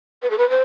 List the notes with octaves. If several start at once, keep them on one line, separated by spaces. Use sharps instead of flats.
B4
A4
B4
C5